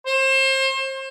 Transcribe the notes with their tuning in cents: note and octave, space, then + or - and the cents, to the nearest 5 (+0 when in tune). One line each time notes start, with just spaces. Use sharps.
C5 +30